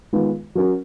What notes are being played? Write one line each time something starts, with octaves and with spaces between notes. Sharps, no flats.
D#3 G#3 B3 F4
F#3 C#4 F#4 A#4